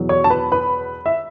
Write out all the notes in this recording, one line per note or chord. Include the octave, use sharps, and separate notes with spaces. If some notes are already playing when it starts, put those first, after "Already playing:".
Already playing: E2 B2 F#3
C#5 C#6
A5
B4 B5
B4 B5
E5